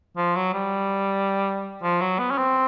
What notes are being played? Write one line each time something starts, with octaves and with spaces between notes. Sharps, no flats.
F3
F#3
G3
F3
F#3
B3
C#4
C4